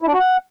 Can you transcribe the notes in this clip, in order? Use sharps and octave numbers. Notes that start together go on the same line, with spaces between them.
E4
D4
F#4
F#5